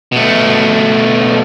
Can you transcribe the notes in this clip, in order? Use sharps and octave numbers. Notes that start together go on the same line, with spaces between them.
B2 A3